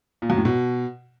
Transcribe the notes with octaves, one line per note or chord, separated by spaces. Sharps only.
A#2
F#2
A2
B2